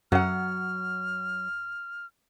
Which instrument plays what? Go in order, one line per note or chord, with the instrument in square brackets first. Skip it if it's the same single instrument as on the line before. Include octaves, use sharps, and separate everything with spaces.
[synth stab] F#2 [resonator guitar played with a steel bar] F#3 F#5 [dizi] F6